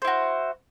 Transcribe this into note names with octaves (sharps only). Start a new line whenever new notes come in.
E4 F#4 C5